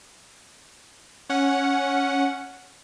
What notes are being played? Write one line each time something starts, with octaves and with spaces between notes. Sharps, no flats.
C#4 F#5